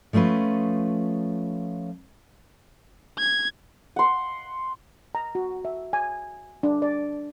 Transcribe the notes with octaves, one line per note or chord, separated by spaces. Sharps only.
F3 A3 C#4 F4 B4
G#6
F#5 C6
A#5
F#4
E5
G#5
D4
D5